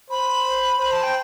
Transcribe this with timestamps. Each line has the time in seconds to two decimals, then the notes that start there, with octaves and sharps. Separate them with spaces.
0.10 C5 B5
0.79 C5 B5
0.92 A5
1.03 G5